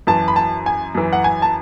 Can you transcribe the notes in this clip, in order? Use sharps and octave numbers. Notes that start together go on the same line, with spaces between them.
F#2 E3 A5
B5
A5
G#5
F#2 E3
F#5
G#5
A5